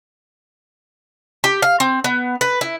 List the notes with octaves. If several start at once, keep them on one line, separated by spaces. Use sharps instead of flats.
G4
F5
C4
B3
B4
E4